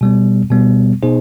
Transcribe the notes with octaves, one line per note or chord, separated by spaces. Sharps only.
B2 G3 B3
B2 G3 B3
B2 B3 D#4 G#4 C5